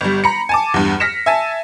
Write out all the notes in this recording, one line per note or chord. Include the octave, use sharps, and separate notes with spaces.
G1 G3
A#5 B5 C#7
G#5 A5 D6
E2 G2
F6 A#6 B6 C#7 E7
E5 G#5 A5